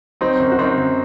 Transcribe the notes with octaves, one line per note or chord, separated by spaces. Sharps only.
F#3 C4 D#4
F#2
F#4
F#2 C4 D#4
F#2